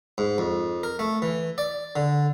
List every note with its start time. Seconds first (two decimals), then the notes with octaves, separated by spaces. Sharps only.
0.18 G#2
0.38 F2
0.83 A#4
0.99 A3
1.22 E3
1.58 D5
1.96 D3